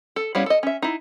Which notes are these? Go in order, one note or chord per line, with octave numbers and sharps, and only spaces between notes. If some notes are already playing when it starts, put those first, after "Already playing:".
A4
G3 B3 C#4 E4 F5
A4 D#5
C#4 E5
D#4 E4